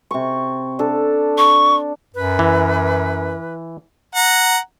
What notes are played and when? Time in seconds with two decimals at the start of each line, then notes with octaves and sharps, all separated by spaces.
0.11 C3 C#6
0.79 D4 A4
1.38 C#6
2.15 F#2 B4
2.39 E3
4.15 F#5 A#5